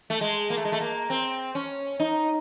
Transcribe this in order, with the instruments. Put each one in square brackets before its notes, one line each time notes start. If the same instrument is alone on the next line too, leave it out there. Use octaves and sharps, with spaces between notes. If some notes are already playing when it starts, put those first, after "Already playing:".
[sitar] A3
G#3
A#3
A3
G#3
A3
A#3
C4
C#4
D#4